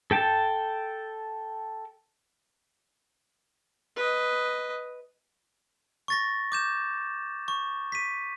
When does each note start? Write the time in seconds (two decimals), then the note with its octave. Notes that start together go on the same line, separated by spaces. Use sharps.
0.11 A4 G5 A5
3.96 B4 D#5
6.08 C#6 A6 A#6
6.52 D6 G6 E7
7.48 C#6
7.92 B6 D#7